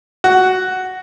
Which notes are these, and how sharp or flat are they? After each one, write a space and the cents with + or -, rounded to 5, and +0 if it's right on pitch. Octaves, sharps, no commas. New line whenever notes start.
F#4 +5